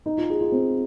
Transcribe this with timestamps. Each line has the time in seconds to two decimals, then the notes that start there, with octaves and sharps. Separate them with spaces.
0.06 D#4
0.18 F4
0.30 G#4
0.41 F4
0.52 C4